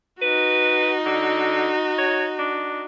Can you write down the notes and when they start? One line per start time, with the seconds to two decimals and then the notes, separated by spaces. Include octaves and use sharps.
0.22 D#4 F#4 B4
1.05 D3
1.98 C#5
2.39 D4